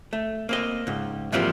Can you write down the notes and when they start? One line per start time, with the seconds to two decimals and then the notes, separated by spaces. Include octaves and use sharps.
0.13 A3
0.49 A#3 C4 D#5
0.87 C#2 G#2
1.32 G#2 E3 F3 G3 A#3 C4